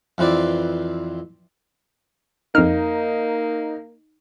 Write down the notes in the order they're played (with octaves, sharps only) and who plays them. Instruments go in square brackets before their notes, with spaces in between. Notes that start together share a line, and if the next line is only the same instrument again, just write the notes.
[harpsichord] F2 E3 C4 B4 D5
[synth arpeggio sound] F2 F6 [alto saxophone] A#3 [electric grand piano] D#4